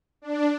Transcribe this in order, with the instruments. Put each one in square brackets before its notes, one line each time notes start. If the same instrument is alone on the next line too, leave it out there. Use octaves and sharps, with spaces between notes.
[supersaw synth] D4